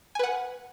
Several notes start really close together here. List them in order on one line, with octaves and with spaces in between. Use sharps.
G#5 B4 F#5